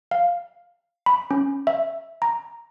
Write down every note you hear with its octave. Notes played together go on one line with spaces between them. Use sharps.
F5
B5
C#4
E5
A#5